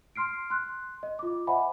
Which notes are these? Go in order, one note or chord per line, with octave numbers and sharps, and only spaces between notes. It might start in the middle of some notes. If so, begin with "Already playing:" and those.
C6 F6 C7 D7
C6 F#6
D#5
F4 D6
C5 D#5 E5 F#5 G#5 B5